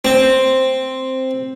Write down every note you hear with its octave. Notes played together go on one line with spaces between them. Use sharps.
C4